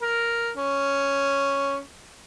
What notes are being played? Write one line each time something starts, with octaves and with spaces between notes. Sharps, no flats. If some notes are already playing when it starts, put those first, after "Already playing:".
A#4
C#4